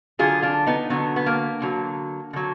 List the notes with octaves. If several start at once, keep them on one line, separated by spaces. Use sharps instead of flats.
D3 F#3 F4 G#4
D4 F4
B3 D#4
D3 F#3 B3
B3
A#3
D3 F#3
D3 F#3